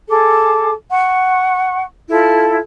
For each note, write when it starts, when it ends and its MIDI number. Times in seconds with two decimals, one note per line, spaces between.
0.08 0.70 68
0.08 0.70 69
0.08 0.70 86
0.90 1.82 78
0.90 1.82 85
2.09 2.56 64
2.09 2.56 65
2.09 2.56 69